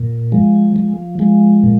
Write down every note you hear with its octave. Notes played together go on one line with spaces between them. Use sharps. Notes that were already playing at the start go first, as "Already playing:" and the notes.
Already playing: A#2
F3 G#3
F3
F3 G#3
A#2